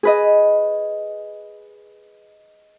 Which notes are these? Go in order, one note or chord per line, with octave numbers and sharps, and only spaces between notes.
G#4 B4 D#5